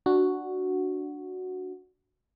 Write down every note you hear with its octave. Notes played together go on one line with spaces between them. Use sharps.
D4 F#4